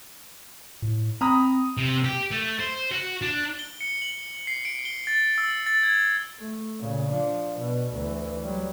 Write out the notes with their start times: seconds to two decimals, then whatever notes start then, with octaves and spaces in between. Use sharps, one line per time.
0.82 A2
1.21 C4 A#5 B5 D#6
1.77 C3
2.05 G4
2.31 A3
2.60 C5
2.92 F#4
3.22 D4
3.59 G7
3.81 C#7
4.02 F#7
4.47 C7
4.65 D7
4.85 G7
5.07 A6
5.38 E6
5.66 A6
5.83 G#6
6.39 A3
6.80 A#2 C#3
7.10 F3 D4
7.60 B2
7.93 D2 E3
8.42 F#3 G3